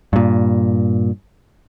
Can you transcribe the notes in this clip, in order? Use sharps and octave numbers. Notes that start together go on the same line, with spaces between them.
G2 A#2